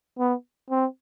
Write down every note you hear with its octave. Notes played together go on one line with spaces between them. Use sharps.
B3
C4